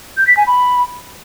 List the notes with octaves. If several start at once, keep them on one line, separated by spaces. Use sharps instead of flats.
G6
B6
G#5
B5